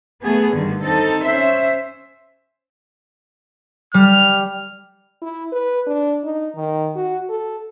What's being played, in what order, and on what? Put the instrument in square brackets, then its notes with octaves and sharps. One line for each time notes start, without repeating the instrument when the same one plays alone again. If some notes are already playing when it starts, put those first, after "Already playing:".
[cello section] A3 B3 G#4
G2 D3 D#3
C4 D#4 A4
C#4 C5 E5
[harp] G3 [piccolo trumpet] F6
[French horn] E4
B4
D4
D#4
D#3
F#4
A4